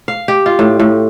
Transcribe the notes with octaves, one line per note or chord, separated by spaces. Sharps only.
F5
G4
F4
A2
A2